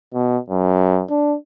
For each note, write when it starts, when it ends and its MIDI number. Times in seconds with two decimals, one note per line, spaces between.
0.14 0.38 47
0.50 1.03 42
1.10 1.36 62